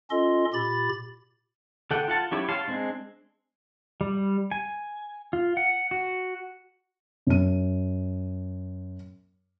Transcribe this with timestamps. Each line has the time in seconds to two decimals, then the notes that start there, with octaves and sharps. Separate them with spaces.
0.11 C#4 F4 A4 D#5 C6
0.53 A#2 G4 B5 A6
1.91 D3 A4 F#5 G5
2.08 F4 F#5 A5
2.32 F#3 C#4 E4 G4 C#5
2.49 C#5 F5 A5 C6
2.68 G#3 C4 D4
4.01 G3
4.51 G#5
5.33 F4
5.57 F#5
5.91 F#4
7.27 F#2 D#7